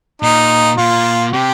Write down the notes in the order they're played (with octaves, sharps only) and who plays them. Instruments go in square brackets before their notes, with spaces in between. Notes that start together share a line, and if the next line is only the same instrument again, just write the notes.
[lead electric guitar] A#2 [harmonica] D#4
[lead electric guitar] A#2 [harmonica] F4
[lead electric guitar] C3 [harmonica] G4